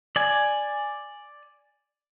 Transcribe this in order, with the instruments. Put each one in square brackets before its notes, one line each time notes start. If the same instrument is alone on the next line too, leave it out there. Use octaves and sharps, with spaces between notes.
[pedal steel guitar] D5 G#5